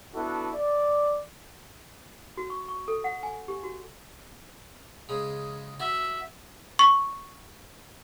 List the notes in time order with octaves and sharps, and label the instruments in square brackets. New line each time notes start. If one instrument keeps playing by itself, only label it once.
[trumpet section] B3 D4 E4 F#4 A4
D5
[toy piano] F#4
C#6
C#6
A4
F#5
G#5
G4
F#4
[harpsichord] C#3 G#3
[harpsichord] F#4 [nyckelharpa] E5
[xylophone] C#6